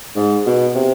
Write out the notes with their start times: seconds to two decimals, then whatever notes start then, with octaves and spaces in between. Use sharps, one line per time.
0.16 G#2
0.46 B2
0.75 C3